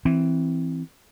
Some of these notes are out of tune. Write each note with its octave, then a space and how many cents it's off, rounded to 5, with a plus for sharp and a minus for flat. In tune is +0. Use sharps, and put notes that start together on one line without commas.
E3 +0 C4 +0